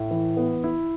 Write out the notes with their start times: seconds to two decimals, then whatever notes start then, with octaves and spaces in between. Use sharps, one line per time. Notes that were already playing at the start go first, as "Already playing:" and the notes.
Already playing: A2
0.11 E3
0.37 B3
0.64 E4